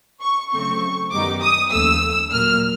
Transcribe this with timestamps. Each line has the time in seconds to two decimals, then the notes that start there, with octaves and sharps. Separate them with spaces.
0.21 C#6
0.52 C#3 F#3 A3 C4 C#6
1.11 F#2 D#3 G3 B3 D#4 D6
1.41 D#6
1.71 D#2 C#3 F3 A3 E6
2.32 A#2 F#3 A#3 F6